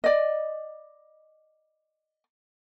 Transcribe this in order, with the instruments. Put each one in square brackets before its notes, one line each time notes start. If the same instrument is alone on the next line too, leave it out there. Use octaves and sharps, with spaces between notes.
[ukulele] D5 D#5